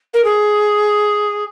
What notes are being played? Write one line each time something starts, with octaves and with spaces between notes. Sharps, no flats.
A#4
G#4